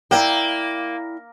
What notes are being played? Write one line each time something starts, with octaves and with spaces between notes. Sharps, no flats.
A#3 E4 D5 G5